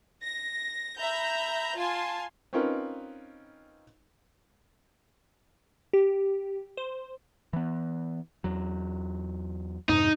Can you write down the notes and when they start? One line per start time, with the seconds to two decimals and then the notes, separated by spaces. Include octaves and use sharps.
0.22 A#6
0.99 E5 A#5 B5 G6
1.77 F4 G#5 A5 C6
2.53 C4 C#4 D#4 F4 A#4 B4
5.93 G4
6.77 C5
7.53 E3 B3
8.44 E2 F#3
9.89 F2 G#2 C3 D#4